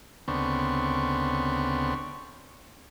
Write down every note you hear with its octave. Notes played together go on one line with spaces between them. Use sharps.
D2 C#3 B3 C4 D4 C#6